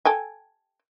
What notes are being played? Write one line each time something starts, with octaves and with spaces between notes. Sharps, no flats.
A4 G5 G#5